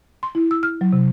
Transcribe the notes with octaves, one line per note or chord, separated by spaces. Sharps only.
C6
E4
E6
F6
F#3
C3